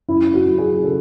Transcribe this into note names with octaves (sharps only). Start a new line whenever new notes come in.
F#2 E4
F#4
F#3
G#4
G#4
C#3 A4